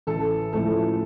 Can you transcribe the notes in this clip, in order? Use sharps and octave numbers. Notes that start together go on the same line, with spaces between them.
A1 A4
A2 F3 A3 A4